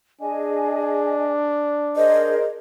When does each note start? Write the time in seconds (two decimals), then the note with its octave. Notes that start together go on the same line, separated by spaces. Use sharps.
0.21 D4 G#4 D#5 G#5
1.96 G#4 A#4 C5 D#5